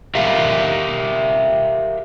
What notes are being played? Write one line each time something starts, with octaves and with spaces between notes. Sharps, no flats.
G4 A#4 E5 F5